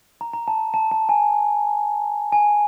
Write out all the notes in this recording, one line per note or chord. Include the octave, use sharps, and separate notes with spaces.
A#5
A#5
A5
A5
A5
G#5
G#5